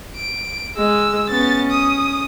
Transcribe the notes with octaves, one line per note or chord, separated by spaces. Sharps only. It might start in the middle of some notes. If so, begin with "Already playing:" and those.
D7
G#3 E6
B3 C#4 A6
D#6